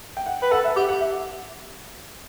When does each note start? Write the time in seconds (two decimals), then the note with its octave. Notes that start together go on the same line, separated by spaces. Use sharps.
0.17 G5
0.26 F#5
0.42 B4
0.51 A4 F#5
0.64 E5
0.76 G4 F#5
0.89 F#5
1.01 E5